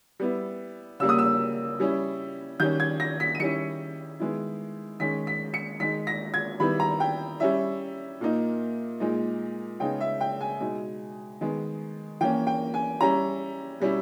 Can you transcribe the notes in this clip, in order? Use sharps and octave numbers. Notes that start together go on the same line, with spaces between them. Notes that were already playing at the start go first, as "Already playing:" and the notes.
G3 B3 E4
C#3 G3 A#3 E6
D#6
E6
G3 C#4 E4
D#3 G3 C#4 G6
G#6
A#6
B6
D#7
D#3 G3 C#4 E4 C#7
D#3 G#3 B3 E4
D#3 G#3 C#4 B6
B6
C#7
D#3 G#3 D#4 B6
A#6
G#6
D#3 G3 B3 E4 B5
A#5
G5
G3 C#4 E4 E5
A#2 A#3 D#4
A#2 G#3 D#4
C#3 G#3 B3 D#4 G5
E5
G5
G#5
B2 G#3 D#4
D#3 G#3 B3
E3 A#3 C#4 G5
G5
G#5
G3 C#4 E4 A#5
B2 G3 C#4 E4